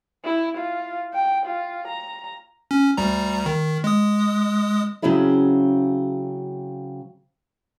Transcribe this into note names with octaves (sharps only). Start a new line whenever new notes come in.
E4
F4
G5
F4
A#5
C#4
D2 G3 A#5
D#3
G#3 D#6
C#3 F#3 C4 C#4 E4 G#4